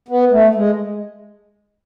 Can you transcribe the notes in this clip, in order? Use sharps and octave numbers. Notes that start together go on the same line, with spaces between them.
B3
A3
G#3